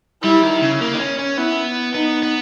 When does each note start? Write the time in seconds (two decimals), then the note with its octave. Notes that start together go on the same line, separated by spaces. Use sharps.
0.23 G3 E4
0.43 D#3
0.62 C#3
0.81 A#3
0.94 D#4
0.99 C#4
1.19 C#4
1.37 B3 E4
1.94 B3 D#4
2.23 B3